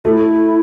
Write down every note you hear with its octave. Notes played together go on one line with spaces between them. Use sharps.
A3 F#4
E4